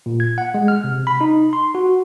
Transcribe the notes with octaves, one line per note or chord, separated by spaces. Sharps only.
A#2
G#6
F#5
G#3
F6
C3
B5
D#4
C6
F#4